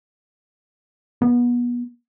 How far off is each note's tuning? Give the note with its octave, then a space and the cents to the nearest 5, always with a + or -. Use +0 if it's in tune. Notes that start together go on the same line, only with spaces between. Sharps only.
B3 -30